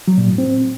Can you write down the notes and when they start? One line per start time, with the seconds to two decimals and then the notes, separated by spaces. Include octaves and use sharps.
0.08 F#3
0.18 A#2
0.28 A2
0.38 C4